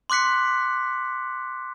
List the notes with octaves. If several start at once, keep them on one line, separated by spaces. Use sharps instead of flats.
C6 D6 F#6 B6 C#7